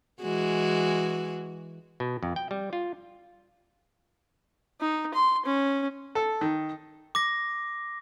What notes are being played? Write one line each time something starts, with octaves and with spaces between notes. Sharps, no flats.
E3 G#3 F#4
B2
F2
G5
G3
F4
D#4
C6
C#4
A4
D#3
D6 A#6